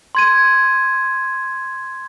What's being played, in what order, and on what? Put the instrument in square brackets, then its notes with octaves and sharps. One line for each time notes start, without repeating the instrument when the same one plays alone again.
[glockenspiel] C6 G#6 D#7